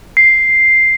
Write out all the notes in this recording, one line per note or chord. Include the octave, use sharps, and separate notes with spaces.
C7